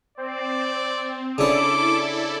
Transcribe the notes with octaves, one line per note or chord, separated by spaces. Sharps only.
C4 D5
C#3 D4 E4 A4 D5 D6